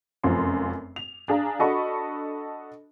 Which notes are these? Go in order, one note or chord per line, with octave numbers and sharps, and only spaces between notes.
F1 F#2 F3 C6
F7
D4 G#4 F5 A#5
D4 F#4 A4 D#5 B5 C#6